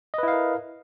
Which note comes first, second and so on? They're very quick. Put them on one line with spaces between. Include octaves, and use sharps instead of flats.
D#5 B4 E4 F5 A#4